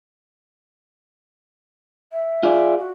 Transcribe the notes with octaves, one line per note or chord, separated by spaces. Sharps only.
E5
F4 G#4 D5
F#4